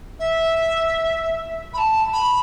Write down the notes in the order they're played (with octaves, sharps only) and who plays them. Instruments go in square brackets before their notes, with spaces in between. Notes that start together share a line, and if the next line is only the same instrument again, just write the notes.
[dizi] E5
B5
A5
B5